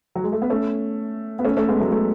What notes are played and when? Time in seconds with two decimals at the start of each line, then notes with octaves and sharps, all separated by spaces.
0.15 F#3
0.24 G#3
0.32 A3
0.42 B3
0.50 A3 C#4
1.39 B3
1.45 A3 C#4
1.57 A3 C#4
1.69 G#3 B3
1.80 F#3 A3
1.92 F#3 A3